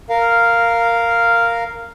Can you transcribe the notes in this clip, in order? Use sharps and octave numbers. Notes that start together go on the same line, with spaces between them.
A#4 F5